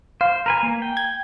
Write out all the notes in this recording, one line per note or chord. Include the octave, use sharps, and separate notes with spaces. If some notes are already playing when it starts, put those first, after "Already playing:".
C5 F5
A#4 B4 G#5
A#3
G5
G#6